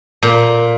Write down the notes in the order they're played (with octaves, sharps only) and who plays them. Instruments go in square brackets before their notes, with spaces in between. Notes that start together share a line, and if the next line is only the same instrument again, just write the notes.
[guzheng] A#2